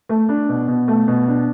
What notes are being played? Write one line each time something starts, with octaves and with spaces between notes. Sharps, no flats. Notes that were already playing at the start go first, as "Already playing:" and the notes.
A3
D4
B2
B2
A3
B2
D4